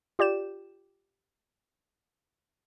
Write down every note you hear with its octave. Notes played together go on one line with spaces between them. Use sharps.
F4 G4 D5 G6 E7